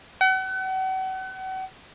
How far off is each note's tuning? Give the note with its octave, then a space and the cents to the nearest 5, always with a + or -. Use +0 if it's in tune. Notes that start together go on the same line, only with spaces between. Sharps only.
F#5 +40